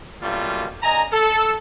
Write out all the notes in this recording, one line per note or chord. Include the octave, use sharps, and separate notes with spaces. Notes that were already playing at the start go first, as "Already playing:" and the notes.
F#2 B2 G3 A3 A#3 F4
D3 D#5 G#5 A#5
A4